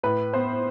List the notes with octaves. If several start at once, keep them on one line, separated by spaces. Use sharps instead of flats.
A2 B4
B3 C5